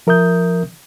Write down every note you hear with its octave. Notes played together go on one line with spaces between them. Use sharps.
F3 A#4 E5 D#6 G6